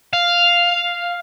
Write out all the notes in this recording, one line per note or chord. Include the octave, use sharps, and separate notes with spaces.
F5